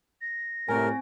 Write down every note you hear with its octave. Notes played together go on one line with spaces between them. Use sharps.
A#6
A2 C3 G3 C4 A#4 G#5